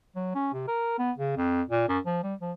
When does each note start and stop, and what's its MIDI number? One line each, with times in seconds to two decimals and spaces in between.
0.15 0.34 54
0.35 0.50 61
0.53 0.66 48
0.67 0.97 70
0.98 1.11 59
1.17 1.33 49
1.37 1.62 41
1.69 1.88 46
1.88 1.99 42
2.06 2.20 53
2.23 2.34 55
2.41 2.52 53